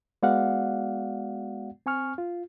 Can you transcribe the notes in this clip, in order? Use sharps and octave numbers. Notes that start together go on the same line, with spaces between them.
G#3 B3 F#4 D5 F5 F#5
C4 G#5 C#6 F6
F4